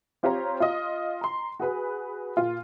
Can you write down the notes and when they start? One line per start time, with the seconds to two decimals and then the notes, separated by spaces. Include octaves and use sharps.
0.23 C4 F4 G4 C5 C#5 A#5
0.60 F4 D#5
1.21 A#5 C6
1.60 F#4 G#4 B4 B5
2.37 A#2 F4